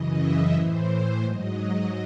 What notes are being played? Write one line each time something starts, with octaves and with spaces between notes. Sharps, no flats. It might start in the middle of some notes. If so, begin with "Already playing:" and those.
Already playing: F#2 C#3 E3 D#5
E5
A2 E3 C5
G#2 F#3 D#5